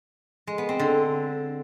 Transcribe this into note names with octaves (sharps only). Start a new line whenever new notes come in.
G#3
B3
C4
D3